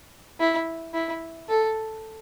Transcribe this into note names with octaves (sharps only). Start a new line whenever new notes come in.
E4
E4
A4